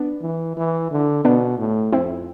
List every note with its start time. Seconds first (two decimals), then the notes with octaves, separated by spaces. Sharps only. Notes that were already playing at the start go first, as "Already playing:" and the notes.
Already playing: B3 D4
0.21 E3
0.57 E3
0.91 D3
1.25 B2 B3 D4
1.58 A2
1.92 F2 C4 E4